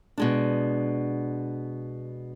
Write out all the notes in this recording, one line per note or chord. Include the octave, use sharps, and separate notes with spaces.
B2 G#3 D4